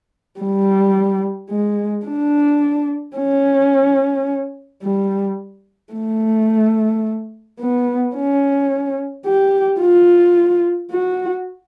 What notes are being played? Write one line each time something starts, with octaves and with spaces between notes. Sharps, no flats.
G3
G#3
D4
C#4
G3
A3
B3
C#4
G4
F4
F#4